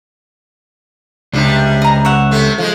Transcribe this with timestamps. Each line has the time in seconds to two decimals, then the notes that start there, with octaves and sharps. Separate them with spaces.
1.33 C#2 C3 G3 D4
1.82 D#5 A#5
2.05 C#5 E5 F#5
2.31 C3 A3 C4
2.58 F3 G#3